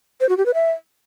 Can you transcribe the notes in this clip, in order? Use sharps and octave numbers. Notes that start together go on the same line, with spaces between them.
C5
F#4
G4
B4
E5